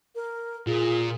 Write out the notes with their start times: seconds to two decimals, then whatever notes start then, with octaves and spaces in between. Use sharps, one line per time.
0.15 A#4
0.67 A#2 F4 G#4